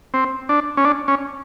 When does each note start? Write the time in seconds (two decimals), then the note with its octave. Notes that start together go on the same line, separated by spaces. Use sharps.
0.14 C4
0.49 D4
0.77 C#4
0.85 D4
1.08 C#4